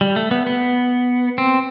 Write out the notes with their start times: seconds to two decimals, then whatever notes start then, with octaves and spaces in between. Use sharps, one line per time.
0.01 G3
0.16 A3
0.31 B3
0.47 B3
1.38 C4